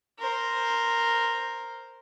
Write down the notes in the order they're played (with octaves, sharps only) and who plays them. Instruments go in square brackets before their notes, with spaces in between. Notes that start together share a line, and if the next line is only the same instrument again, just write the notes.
[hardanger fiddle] A#4 C5